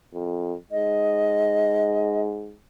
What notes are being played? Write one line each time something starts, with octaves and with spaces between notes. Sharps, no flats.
F2
G#2 D#5